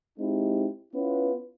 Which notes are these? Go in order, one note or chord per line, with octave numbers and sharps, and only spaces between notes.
G#3 C4 D#4 E4 G4
B3 C#4 E4 F4 B4